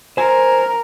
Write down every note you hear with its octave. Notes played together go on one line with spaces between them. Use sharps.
A#4 C5 G#5